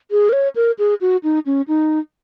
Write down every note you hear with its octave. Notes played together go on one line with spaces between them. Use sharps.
G#4
A#4
C#5
A#4
G#4
F#4
D#4
C#4
D#4